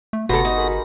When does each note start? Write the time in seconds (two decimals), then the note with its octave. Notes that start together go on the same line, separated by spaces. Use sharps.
0.13 A3
0.29 G1 C3 B3 F#4 A4 A#6
0.45 D#4
0.56 G#4 A#4 B5